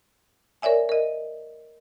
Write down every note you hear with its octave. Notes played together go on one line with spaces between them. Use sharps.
A#4 C#5 D5 E5 G#5
A#4 D#5